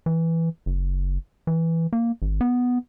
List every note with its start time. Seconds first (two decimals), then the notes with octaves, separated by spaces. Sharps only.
0.06 E3
0.66 F#1
1.47 E3
1.93 A#3
2.22 G#1
2.41 B3